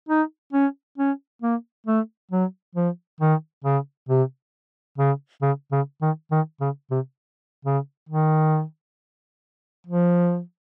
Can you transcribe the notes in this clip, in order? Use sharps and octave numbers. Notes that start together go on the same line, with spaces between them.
D#4
C#4
C#4
A#3
A3
F#3
F3
D#3
C#3
C3
C#3
C#3
C#3
D#3
D#3
C#3
C3
C#3
D#3
F3